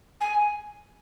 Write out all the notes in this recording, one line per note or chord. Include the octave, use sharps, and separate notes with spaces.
G#5